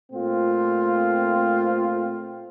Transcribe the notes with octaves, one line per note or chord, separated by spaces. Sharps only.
A#2 A3 C4 F4